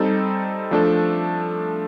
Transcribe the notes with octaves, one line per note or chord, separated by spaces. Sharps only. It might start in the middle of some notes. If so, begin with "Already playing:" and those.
Already playing: G3 C4 D#4 A4
F3 A3 D4 A4